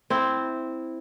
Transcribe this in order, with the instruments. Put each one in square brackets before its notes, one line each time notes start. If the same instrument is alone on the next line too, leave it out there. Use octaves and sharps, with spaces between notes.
[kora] C4 E4